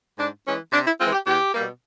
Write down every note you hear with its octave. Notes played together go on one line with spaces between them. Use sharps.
G#2 D4
E3 G#3 C#4
C3 D4
E4
E3 G#3 C4 F4
G4
E2 G4
B2 G3 A#3